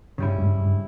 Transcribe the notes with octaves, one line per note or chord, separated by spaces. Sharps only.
G2 C#3 G3 C#4 E4
G2
G2